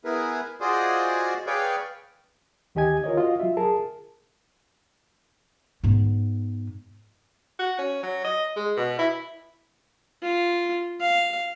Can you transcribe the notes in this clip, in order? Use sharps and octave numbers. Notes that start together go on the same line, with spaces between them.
B3 E4 G#4 A#4 B4
F4 F#4 G#4 C5 D5 D#5
G#4 B4 C#5 D5 F5 G5
D2 D#3 G4 D#5 G#5 G#6
F4 A#4 C#5 D#5
F4 F#4 D#5 F5
F#3 F4 E5
G#4 A#4 A5
G#2 B3
F#4
C#4
F#3
D#5
G#3
B2
E4
F4
F5